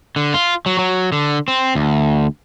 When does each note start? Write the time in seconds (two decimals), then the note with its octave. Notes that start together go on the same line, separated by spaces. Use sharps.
0.16 D3
0.34 F4
0.66 F#3
0.79 F#3
1.12 D3
1.48 C4
1.75 D2